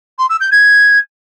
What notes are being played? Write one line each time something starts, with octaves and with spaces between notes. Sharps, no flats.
C6
E6
G6
G#6